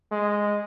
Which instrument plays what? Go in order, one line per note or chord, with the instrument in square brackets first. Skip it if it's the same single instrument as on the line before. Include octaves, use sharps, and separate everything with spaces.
[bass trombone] G#3